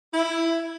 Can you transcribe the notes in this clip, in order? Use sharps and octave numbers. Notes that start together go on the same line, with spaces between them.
E4